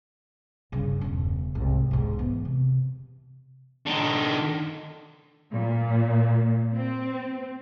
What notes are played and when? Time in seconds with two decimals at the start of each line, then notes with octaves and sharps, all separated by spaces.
0.72 G2 C#3
1.01 E1 C#3
1.55 C2 G#2
1.91 E1 G#2
2.19 E3 B3
2.45 C3
3.86 D3 D#4
5.52 A#2
6.75 C4